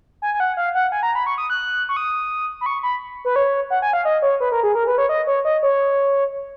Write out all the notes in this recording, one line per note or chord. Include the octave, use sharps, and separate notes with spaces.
G#5
G#5
F#5
F5
F#5
G#5
A#5
B5
C#6
D#6
F#6
C#6
D#6
B5
C#6
B5
B4
C#5
F#5
G#5
F5
D#5
C#5
B4
A#4
G#4
A#4
B4
C#5
D#5
C#5
D#5
C#5